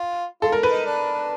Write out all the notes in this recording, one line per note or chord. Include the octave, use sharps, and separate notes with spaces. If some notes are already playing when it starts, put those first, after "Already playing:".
Already playing: F4
F4 A4
A#4
B4
D#4
D4